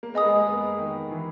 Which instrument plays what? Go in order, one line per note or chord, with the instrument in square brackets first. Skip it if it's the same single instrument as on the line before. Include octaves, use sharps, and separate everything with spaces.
[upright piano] A#3
[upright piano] B3 [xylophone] G#4 D#5 G#5 D#6
[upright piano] G#3
A#3
B3
D#3
E3